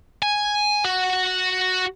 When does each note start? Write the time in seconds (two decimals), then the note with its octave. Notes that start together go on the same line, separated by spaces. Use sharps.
0.22 G#5
0.85 F#4